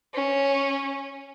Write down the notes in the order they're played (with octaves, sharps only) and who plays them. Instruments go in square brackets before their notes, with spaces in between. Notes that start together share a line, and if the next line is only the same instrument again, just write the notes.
[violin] C#4